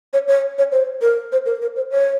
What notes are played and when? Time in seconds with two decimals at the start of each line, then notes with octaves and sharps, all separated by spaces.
0.13 C#5
0.28 C#5
0.58 C#5
0.72 C5
1.01 A#4
1.32 C5
1.46 A#4
1.61 A#4
1.76 C5
1.91 C#5